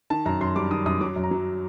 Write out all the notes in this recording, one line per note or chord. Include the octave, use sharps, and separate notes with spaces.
D#3 A5
F#2 A#5
F#2 C6
G3 D6
D#3 D#6
F#2 D#6
F#3 D6
F#2
A#5
F#3